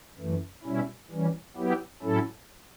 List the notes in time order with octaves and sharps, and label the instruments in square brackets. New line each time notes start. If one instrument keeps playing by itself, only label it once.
[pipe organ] F#2 E3 A3
B2 G3 C#4 E4
E3 G3 C#4
F#3 B3 E4 G4
A2 F#3 C#4 E4 A4